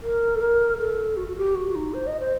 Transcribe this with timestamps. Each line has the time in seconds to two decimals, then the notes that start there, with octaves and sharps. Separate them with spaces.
0.02 A#4
0.35 A4
0.41 A#4
0.78 A4
1.17 F#4
1.28 F#4
1.37 G4
1.55 F#4
1.69 F#4
1.75 D#4
1.93 C5
2.07 D#5
2.20 C5